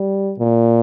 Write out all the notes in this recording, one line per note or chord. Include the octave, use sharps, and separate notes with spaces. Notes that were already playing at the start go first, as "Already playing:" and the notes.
Already playing: G3
A#2